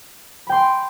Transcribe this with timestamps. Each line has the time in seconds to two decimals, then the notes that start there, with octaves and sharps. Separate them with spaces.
0.47 B5
0.49 G5
0.52 C6